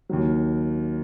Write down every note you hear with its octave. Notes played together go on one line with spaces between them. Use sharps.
D#2 D#3 F#3